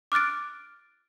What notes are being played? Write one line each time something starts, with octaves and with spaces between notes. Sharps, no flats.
D6 F6 F#6 A6 D7